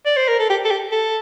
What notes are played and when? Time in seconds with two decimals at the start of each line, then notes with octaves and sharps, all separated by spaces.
0.06 D5
0.17 C5
0.28 A#4
0.39 A4
0.50 G4
0.65 A4
0.71 G4
0.92 A4